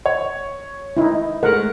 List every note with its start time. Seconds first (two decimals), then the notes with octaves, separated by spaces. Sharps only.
0.06 C#5
0.97 D#4 E4
1.43 G#3 A3 A#4 F#5